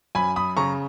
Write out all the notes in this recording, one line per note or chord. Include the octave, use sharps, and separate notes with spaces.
F#2 G#5 B5
B5 D#6
C#3 A#5 C#6